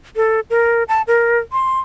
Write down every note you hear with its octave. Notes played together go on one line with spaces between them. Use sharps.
A4
A#4
A5
A#4
C6